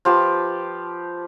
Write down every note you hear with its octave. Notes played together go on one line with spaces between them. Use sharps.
F3 G4 B4 A5